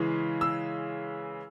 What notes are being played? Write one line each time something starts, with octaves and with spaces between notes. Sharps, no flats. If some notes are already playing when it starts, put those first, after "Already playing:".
Already playing: C#3 E3 G#3
E6